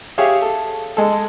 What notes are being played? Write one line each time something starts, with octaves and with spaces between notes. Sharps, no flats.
G4 G#4 C#5 E5 F5
A4
G#3 A4